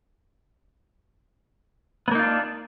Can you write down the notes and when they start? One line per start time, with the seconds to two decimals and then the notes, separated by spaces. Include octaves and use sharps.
2.08 B3
2.11 A#3
2.15 D#4
2.19 F4
2.23 D4